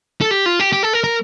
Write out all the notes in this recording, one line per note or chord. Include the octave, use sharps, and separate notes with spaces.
A4
G4
F4
G4
G4
A4
A#4
A#4